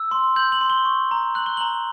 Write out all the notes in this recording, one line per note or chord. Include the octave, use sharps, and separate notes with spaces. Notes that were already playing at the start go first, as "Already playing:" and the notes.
Already playing: E6
C6
G6 F#7
F#7
C6
G7
C#6
A#5
F#6 F#7
G7
A#5 F#7